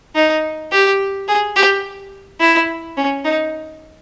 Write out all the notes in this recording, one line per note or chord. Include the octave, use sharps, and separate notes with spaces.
D#4
G4
G#4
G4
E4
C#4
D#4